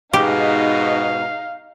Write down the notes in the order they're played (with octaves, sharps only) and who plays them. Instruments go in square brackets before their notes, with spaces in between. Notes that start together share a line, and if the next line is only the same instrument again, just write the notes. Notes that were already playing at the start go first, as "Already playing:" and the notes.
[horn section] G#2 B2 [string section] D#4 [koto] G4 [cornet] F5